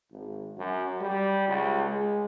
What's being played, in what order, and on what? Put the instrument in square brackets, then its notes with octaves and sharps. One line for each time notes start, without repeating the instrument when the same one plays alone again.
[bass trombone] G#1
F#2
G3
C#2
G#3